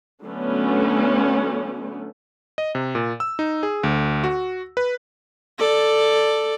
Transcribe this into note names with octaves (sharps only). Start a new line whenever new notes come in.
D3 F#3 A3 B3 C#4
D#5
C3
A#2
E6
D#4
G#4
D2
F#4
B4
A4 D5